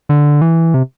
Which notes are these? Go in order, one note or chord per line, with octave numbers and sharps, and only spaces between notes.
D3
E3
C3